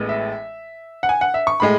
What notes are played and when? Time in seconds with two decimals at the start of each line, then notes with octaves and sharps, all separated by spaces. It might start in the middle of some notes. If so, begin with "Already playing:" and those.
Already playing: A1 A2 G#3 B3
0.09 E5
1.03 F#5
1.09 G#5
1.21 F#5
1.34 E5
1.47 C#6
1.60 A2 G#3 B5